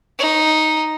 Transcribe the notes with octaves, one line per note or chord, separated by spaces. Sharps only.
D#4